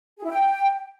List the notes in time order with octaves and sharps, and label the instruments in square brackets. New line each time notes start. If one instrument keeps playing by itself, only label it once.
[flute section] G#4
E4
G5